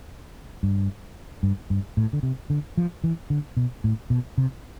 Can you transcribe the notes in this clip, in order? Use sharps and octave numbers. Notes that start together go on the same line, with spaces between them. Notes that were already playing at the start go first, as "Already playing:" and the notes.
G2
G2
G2
A2
D3
C3
D3
F3
E3
D3
B2
A2
B2
C3